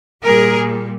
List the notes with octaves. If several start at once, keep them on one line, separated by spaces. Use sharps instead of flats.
A#2 G3 A#3 G#4 A#4